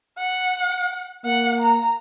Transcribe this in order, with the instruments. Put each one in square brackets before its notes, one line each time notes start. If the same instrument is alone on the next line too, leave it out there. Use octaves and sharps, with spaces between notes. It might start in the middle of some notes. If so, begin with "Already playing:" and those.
[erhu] F#5
[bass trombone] A#3 [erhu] F#5
[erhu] A#5